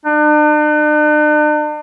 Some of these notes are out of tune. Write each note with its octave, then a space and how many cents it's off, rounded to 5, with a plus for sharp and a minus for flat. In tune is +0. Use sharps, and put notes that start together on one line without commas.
D4 +45